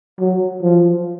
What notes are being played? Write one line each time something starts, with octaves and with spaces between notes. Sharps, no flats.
F#3
F3